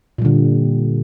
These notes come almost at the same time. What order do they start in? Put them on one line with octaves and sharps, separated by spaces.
A#2 G3 D3